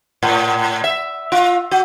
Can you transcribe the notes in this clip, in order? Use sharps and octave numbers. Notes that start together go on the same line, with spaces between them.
A2
E5
F4
F#4